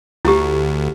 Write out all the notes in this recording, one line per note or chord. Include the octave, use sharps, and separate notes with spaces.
D2 E4 G4